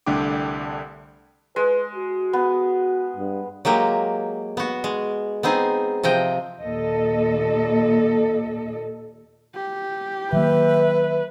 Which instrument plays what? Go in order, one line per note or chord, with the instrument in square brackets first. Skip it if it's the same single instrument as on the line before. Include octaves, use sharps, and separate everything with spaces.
[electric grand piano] C2 D3 A3 D4 G5 D6
[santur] G#3 [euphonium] B4
[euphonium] F#4
[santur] B3
[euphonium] G2
[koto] F#3 G#3 A#3 G4
B3 F#4
G#3
B3 C4 D#4 G#4
C3 F3 D#5 G5
[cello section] D#2 A#2 A4 D#5
[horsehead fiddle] G4
[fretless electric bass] D#3 F#3 A#3 [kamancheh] B4 [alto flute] E5